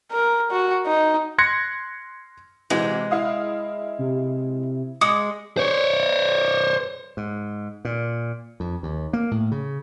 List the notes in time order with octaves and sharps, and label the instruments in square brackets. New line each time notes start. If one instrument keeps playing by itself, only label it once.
[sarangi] A#4
F#4
D#4
[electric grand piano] C6 F#6 G#6 A#6 C#7
[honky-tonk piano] C3 E3 F#4 [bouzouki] G#3
[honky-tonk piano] E4 F5 D#6
[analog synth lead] C3
[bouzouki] G#3 [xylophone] D6 D#6 C#7
[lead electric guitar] C5 C#5
[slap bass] G#2
A#2
F2
D#2
A#3
A2
C#3